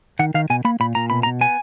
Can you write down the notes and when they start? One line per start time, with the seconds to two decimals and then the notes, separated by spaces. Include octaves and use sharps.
0.19 D#3 F#5
0.34 D#3 F5
0.50 B2 G#5
0.65 A#3 B5
0.80 A#2 B5
0.95 A#2 A#5
1.10 B2 B5
1.23 A#5
1.26 B2
1.41 B3 G#5